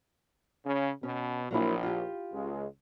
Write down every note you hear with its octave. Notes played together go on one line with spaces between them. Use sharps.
C#3
B2 C#4
A#1 F#3 A#3 E4
F4 G4
C#2 G#3